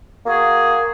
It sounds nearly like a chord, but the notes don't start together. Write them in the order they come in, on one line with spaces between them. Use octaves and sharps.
A#3 F#4 G#4